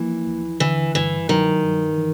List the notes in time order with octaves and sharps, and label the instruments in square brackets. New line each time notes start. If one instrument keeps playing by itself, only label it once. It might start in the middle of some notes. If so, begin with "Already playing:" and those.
Already playing: [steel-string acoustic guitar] E3 [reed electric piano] F3 A#3
[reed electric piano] D#2
[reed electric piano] D3 [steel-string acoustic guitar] E3
[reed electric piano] G2 [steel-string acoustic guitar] E3
[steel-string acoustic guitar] D#3 [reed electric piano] F#3
[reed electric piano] G2
E3